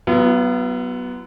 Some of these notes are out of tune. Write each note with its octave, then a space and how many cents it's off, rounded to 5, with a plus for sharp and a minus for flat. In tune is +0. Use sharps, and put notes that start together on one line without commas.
F#3 +30 B3 +0 F4 -45